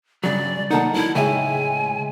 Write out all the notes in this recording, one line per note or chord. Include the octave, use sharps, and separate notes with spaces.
G2 C#3 F#3 D5
D#3 A3 A#3 D#4 F#5 A5
F#3 E4
A2 C#3 G#3 E5 G5 G#5